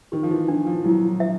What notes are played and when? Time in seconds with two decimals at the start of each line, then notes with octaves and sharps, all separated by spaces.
0.12 D#3 G4
0.23 F3
0.31 E3
0.48 E3 D4
0.66 F3
0.84 F#3 E4
1.20 E5